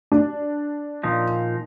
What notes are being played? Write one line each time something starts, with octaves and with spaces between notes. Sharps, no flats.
D4
A#2 F3 D#4